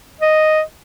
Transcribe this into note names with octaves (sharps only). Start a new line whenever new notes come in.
D#5